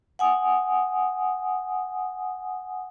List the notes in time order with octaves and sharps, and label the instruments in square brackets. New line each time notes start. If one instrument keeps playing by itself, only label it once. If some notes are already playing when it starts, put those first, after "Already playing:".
[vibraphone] F#5 G#5 D#6